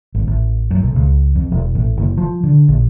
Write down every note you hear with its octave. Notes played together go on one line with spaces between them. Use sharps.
G#1
A1
F#2
B1
C#2
F2
E1
A1
F#1
F3
D3
A#1